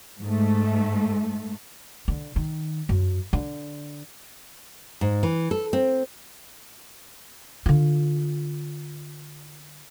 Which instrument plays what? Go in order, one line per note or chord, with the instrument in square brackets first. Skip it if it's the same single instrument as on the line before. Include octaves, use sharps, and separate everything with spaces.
[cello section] G#2 A3
[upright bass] D3
D#3
F#2
D3
[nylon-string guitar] G#2
E3
A4
C4
[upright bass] D3 F4